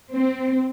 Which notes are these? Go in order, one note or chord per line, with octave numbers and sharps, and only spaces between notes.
C4